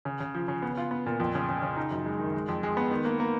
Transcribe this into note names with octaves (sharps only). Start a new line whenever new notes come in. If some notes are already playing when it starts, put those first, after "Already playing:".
C#3
C#3
F3
C#3
B3
F4
B3
A#2
F2
C#3
C#3
C#3
D#4
F#2
G#3
D#3
G#3
F2
G#3
B3
D#3
A#3
A#3